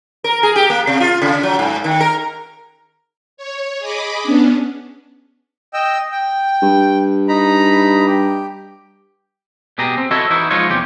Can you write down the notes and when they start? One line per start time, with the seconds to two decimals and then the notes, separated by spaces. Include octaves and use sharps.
0.24 A#4
0.43 G#4
0.56 G4
0.70 A#3
0.87 C3
1.00 F4
1.22 C#3
1.43 F#3
1.59 G#2
1.84 D#3
2.01 A#4
3.37 C#5
3.79 G#4 D#5 B5 D6
4.23 B3 C#4 D4
5.73 D#5 G5 E6
6.12 G5
6.62 G2
7.28 D#4 A#5 B5
8.06 G4
9.78 B2 G4 G#4 A#5
9.98 C4
10.11 E4 F#4 A4 C#5 D#5 E5
10.30 E3 D#4 E4 F#4
10.51 F3 G#3 D#4 F4 C#5
10.70 E2 C3 G4